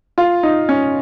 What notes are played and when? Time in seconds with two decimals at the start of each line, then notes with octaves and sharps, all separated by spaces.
0.18 F4
0.43 D#4
0.69 C#4